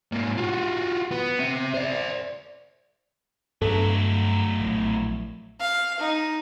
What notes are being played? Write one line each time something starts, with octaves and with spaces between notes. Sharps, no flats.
G#2 A#3
F4 F#4
B3
C4 E5
C5 D5
G2 F#3 A3 B3 A4
A#1 A2
F5
D#4